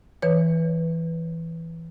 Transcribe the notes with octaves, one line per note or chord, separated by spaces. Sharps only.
E3 B4 C#5